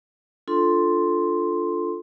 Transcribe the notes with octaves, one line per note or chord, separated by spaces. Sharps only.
D4 F4 A4 C6